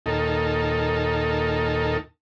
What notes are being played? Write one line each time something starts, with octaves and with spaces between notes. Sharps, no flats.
D#2 A#2 D#4 A4